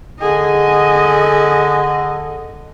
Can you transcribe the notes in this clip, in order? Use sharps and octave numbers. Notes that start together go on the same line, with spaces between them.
D3 G#4 D#5